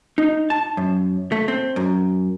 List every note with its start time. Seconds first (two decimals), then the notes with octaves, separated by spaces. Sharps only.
0.18 D#4
0.50 A5
0.77 F#2
1.32 A3
1.48 C4
1.76 F#2